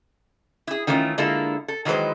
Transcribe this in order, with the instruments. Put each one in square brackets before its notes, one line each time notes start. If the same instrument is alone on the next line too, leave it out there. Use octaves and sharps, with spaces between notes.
[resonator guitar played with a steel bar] E4 G#4
D#3 E3 A3 C#4 F4
D3 G#3 A#3 E4 F4 A4
A4
D#3 E3 F#3 G#3 B4 C5